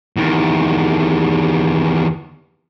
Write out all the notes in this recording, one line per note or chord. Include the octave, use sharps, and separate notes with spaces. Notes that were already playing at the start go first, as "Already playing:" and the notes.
E2 D#3